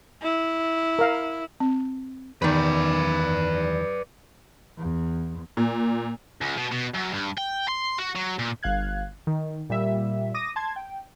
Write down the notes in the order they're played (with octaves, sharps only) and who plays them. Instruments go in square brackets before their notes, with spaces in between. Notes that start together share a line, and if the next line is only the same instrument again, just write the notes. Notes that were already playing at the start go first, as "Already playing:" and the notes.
[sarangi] E4
[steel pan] A#4 F5
[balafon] C4
[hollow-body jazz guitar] E2 D#3 [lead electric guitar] B4 D5
[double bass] E2
[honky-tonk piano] A#2
[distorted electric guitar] C#2
B2
B2
F#2
G2
G5
C6
F#4
F#3
A#2
[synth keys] G1 F5 F#6 G#6
D#3
A#2 G3 E5
D6 D#6 A#6 D#7
A5 C6 G#6
G5